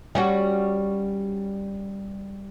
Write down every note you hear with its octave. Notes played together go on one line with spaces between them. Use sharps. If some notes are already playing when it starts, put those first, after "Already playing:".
G3 C#4 F#4